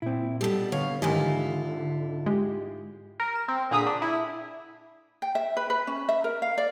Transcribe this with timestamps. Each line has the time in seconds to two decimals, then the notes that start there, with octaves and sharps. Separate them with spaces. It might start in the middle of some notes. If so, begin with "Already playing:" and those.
0.02 A#2 C4 E4
0.41 B2 G3 G4 A4
0.72 D3 B3 C#5 F5
1.02 G#2 D#3 E3 E4 F4 G4 D#5 G#5
2.26 G#3 G4
3.20 A#4
3.36 E7
3.48 C4
3.71 A#2 D3 G#4 A#5 D#6 B6
3.86 D4
4.02 E4
5.22 G5
5.35 E5
5.57 B4
5.70 B4
5.87 C#4
6.09 E5
6.24 A#4
6.42 F5
6.58 D5